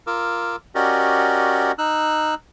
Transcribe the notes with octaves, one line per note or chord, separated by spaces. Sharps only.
F4 A#4 D6 E6
C#4 F#4 G4 A#4 D5 D#5
D#4 E6 F#6